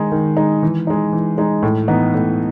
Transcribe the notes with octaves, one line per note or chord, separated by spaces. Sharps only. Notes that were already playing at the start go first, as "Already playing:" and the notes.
Already playing: D#3 G#3 D#4
D#3
G#3 D#4
E3
G#3 D#4
E3
G#3 D#4
A2
E3 B3 D#4
A2